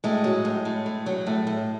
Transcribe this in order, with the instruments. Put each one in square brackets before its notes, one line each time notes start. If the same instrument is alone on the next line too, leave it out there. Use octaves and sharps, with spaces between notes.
[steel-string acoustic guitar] A2 G#3
F#3
A2
A2
A2
F#3
A2
A2